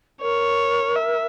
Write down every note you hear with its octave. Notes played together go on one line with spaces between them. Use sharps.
A#4 C#5
E5